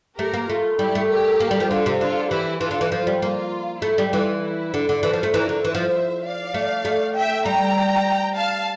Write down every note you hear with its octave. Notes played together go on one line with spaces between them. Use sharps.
A3 G4 A#4
A#3
A3 F4
G3 E4 G4
A3
G4 A#4
A#3
G3
F3
D3 F4 A4
C3
D3 F4 A4
E3 E4 G4
E3 F4 A4
D3
E3
F3 F4
G3
A#3 F4
A3 E4
G3
E3 F4
E4
D3
D3
E3 A4 C5
F3
A3
E3 A#4 D5
D3
E3 C5 E5
F3
D5 F5
A3
A3
E5 G5
G3 G5 A#5
F5 A5